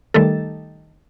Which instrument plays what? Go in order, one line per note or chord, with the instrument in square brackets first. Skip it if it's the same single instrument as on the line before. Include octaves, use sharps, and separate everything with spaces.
[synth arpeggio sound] D#3 G3 A3 A4